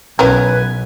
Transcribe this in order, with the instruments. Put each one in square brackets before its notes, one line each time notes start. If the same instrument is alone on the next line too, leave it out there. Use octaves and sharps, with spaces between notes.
[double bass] B1 [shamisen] E3 C#4 A#4 [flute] B4 [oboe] G#5